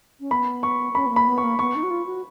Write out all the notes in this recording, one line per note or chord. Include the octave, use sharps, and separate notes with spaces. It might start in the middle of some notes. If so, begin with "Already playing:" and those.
C#4
B3 B5
C#6
C#4 B5
B3
A#3
B5
B3
C#6
A#3
B3 C#6
D#4
F#4
F4
F#4